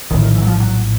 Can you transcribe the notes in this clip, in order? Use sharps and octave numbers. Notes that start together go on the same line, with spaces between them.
A#1 A2 D#3
D#3
E3
F#3
F3
F#3